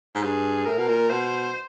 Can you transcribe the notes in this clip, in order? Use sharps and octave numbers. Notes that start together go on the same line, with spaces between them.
G#2
G2 G#4
A2 A#4
B2
A#2
B2 C5